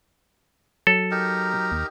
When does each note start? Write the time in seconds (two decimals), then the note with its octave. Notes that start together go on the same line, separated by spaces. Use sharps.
0.87 F#3 A4
1.11 D#4 G4 A#4
1.72 D#2